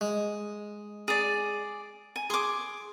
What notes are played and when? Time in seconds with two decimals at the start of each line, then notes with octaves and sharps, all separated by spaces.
0.01 G#3
1.08 G#4 D5
2.16 G#5
2.30 G#4 C6 D6